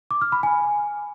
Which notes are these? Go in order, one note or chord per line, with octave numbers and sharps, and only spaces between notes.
D6
F6
B5
G#5